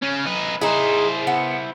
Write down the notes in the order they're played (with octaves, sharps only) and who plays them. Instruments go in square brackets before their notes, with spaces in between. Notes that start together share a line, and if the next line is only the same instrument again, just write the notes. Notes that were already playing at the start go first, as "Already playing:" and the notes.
[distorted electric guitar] C#3 C#4
D#4 B4
[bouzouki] D#4 G#4 [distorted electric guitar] E4 C5
[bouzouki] B3